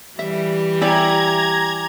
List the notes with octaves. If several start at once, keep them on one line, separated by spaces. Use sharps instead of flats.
E3 G3 E5
E4 G4 D5 G#5 A#5 D6 G#6 F#7